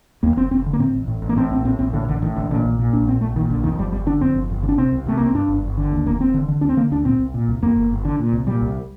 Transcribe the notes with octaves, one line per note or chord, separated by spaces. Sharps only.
D#2 A#3
F1 C4
F1 C4
D3
A#3
A2 C4
A1
A2
A1
A#3
A2 C4
A#1 C4
A2 C4
A#1 C4
A2 D3
A1 D3
A2 D#3
A1 D3
A#2 D3
A#1
A#2
A#1 D4
A#2 C4
A#1 A3
A#2 D#3
A#1 D3
F2 D#3
G1 G3
G1 G3
D3 D4
F2 C4
G1
G1
D3
D4
C3 C4
C2
C3 A3
C2 A#3
C4
G2 D4
G1
G1
D3
D#2
F1 A#3
F1 C4
D3
D3
D2 D4
C4
D3 A#3
D2 D4
A#2 C4
C2
A#2
C2
F2 A#3
G1
G1
D3
A#2
C2
A#2 G3
C2